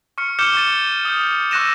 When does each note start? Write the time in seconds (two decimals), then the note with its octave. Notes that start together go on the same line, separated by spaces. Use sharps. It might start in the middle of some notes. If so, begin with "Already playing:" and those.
0.18 C#6 F6 C#7
0.39 D6 F6 G6 C#7 E7 G7
0.56 C#6 A6 D#7
1.05 D#6 G6
1.51 C#6 E6 F#6 A#6 D#7 E7